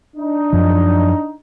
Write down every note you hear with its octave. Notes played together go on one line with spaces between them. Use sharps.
D4 D#4
F#2 F3